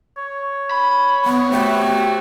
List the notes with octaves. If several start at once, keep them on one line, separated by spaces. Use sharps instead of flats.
C#5
B5
E3 B3 F#5
C3 A3 F#4 F#5 G5